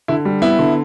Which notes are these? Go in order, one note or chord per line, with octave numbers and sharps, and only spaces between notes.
D3 E4
G3
B3 E4
D3